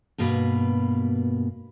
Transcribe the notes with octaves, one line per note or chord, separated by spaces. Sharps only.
G2 B2 A#3 B4